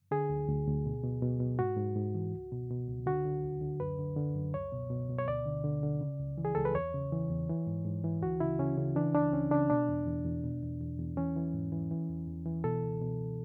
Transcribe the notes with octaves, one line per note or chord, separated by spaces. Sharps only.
D3 G#4
D2
D2
D2
B2
B2
B2
B2
G#2 F#4
G#2
G#2
E3
C#2
B2
B2
C#2
D3 F#4
D3
D2
D3
F#2 B4
D3
D3
F#2
C#2 C#5
B2
B2
B2
C#5
D2 D5
D3
D3
D3
C#3
C#2
E3
G#4
C#2 A4
B4
E2 C#5
C#3
E3
E2
E3
G#2
G#2
E3
D2 F#4
C#3 E4
C#3 C#4
C#3
E3 D4
C#2 D4
C#2 C#4
C#3 D4
B2 D4
E2
E2
E2
B2
E2
E2
E2
E3 C#4
E3
G#2
E3
E3
E2
E2
E3
B2 A4
C#2
B2